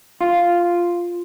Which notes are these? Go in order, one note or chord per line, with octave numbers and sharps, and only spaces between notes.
F4